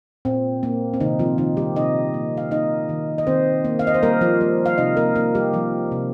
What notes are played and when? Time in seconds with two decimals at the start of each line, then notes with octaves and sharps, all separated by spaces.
0.25 A#2 C4
0.63 A#3
0.94 C4
1.00 C3 D#3 D#4
1.19 F3 F4
1.38 D#3 F3 D#4
1.57 G3 G4
1.76 C3 D#4 D#5
2.14 A#3
2.37 F5
2.51 A#3 D#4 D#5
2.89 D#3
3.18 D#5
3.27 D#3 C4 C5
3.64 A#3
3.79 F5
3.87 D#5
3.94 C5
4.03 G3 A#3 A#4
4.21 F3 F4
4.41 G3
4.66 F5
4.78 C3 D#4 D#5
4.97 A#3 A#4
5.15 A#3 A#4
5.35 G3 G4
5.53 F3 G3 F4
5.92 C3